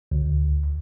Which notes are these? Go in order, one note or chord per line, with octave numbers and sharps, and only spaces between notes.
D2